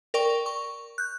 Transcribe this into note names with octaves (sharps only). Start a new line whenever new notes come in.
A#4 D5 G5 C#6
C#6
F#6 G6